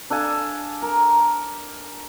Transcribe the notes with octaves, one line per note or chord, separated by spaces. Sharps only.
D4 A4 F5 G#5
A#4